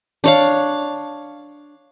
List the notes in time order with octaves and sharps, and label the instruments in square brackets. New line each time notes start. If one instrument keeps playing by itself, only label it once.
[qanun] D4 C#5 F5